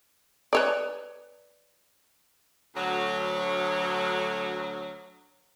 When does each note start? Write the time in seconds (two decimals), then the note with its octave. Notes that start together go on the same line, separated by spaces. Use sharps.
0.53 B4 C#5 D5
2.76 D2 F#3